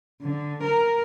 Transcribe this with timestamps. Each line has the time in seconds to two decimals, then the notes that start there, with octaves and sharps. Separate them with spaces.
0.22 D3
0.63 A#4